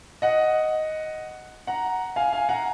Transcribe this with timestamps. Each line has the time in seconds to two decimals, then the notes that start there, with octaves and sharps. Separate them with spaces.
0.22 D#5 F#5
1.67 F#5 A#5
2.16 F5 G#5
2.32 F5 G#5
2.49 F#5 A#5